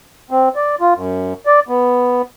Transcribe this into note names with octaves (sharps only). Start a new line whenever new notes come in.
C4
D5
F4
F#2
D5
B3